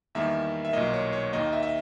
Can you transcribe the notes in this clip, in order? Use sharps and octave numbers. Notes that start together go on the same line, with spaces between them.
E2 D#3 G3 A#3 E5
E5
B1 A#2 A#3 D#5
C#5
C#5
D#2 D#3 A#3 D#5
E5
E5